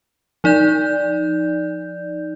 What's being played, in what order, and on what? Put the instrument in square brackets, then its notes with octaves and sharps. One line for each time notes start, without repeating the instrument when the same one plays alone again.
[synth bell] F3 D#4 D5 G6